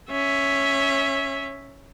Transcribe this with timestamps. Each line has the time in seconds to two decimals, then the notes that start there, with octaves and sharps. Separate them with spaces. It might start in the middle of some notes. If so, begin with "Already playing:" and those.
0.10 C#4 E5